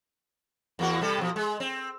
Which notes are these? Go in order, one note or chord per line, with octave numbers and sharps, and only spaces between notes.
E2 A#3 F#4
C3 G3 A4
B2 F3
G#3
C4